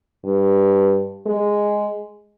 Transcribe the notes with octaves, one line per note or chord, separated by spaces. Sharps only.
G2
G#3